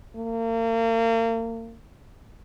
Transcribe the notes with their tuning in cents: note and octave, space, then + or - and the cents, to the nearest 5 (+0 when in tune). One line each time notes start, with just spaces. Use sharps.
A#3 -35